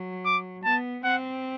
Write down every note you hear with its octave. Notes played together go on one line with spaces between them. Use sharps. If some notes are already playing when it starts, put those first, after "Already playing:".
Already playing: F#3
D6
B3 A5
C4 F#5